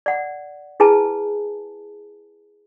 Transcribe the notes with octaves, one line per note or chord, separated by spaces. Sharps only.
D5 F#5
E4 G#4 B4 G#5 A5